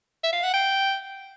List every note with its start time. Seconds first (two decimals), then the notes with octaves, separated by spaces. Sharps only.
0.23 E5
0.33 F5
0.43 F#5
0.54 G5